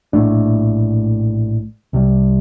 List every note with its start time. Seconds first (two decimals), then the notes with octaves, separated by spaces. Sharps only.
0.13 A#1 A2 A3 D4
1.93 C2 C3 G3